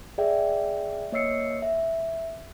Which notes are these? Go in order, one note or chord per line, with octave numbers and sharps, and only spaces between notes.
G#4 D5 E5 G5
A#3 C#5 D#5 E6 C7 C#7
E5